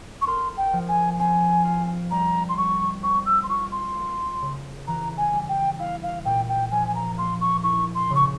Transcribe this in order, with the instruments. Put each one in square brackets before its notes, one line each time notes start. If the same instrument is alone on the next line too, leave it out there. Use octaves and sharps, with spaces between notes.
[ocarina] C#6
[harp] A#4 [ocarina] C6
[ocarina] G5
[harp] F3
[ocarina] G#5
[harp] C4 [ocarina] G#5
[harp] F4
[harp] G3 [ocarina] A#5
[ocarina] C6
[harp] G3 [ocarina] C#6
[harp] C4 [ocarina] C#6
[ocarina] E6
C6
[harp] F4 [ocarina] C#6
[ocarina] C6
[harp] A#3
C#3
[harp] E3 [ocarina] A#5
[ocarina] G#5
[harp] G3
[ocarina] G5
[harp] E4 [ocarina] F5
[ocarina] F5
[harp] A#2 [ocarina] G5
[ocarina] G5
[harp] F3 [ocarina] G#5
[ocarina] G#5
A#5
[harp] A#3 [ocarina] C6
[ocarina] C#6
[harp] E4 [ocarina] C#6
[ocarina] C6
[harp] C#3
[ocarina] C#6